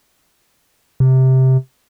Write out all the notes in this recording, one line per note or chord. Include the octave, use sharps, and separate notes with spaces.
C3